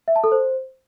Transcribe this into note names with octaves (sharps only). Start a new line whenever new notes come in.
E5
A5
A4
C5